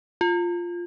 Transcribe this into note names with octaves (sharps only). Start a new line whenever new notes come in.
F4